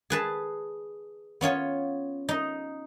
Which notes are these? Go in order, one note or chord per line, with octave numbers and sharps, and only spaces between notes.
G#4 B4 A5
B3 C#4 F4 C#5
D#4 D#5